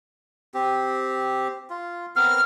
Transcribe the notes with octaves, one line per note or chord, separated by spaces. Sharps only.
C4 G4
F4
B3 C4 A#4 F6